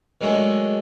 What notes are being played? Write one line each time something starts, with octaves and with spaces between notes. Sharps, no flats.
D#3 F#3 G#3 A3 D4